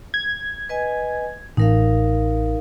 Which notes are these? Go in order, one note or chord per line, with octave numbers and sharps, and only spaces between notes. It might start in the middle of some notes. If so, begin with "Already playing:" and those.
G#6
B4 D#5 G#5
A1 D#4 A#4 F5